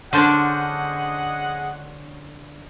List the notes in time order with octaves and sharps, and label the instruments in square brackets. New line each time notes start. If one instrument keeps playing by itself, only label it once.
[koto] D3 D4 [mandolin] C#4 C5 A5 [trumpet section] G#4 D#5 F#5